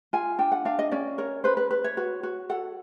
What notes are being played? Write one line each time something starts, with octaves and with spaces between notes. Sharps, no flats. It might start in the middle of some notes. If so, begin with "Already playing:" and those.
F4 G#5
D4 G5
F#5
D4 F5
D#5
C#4 D5
A#4 C#5
B4 C5
B4
B4
C#5
F#4
F#4
A4 F#5